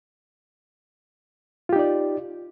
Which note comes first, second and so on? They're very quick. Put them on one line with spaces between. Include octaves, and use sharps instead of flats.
F4 G4 D#4 D5